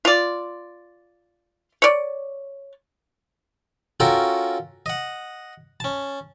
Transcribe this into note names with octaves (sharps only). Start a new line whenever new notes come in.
F4 D5
C#5 D5
C#4 F4 F#4 A4 A#4 G5
D#5 F#5
C#4 A5